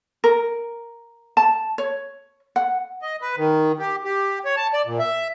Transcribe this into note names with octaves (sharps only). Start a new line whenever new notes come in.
A#4
A5
C#5
F#5
D#5
B4
D#3
G4
G4
C#5
A5
D5
A#2
E5